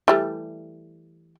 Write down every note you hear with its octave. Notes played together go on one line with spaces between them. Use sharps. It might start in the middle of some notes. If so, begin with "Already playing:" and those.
E3 G3 A3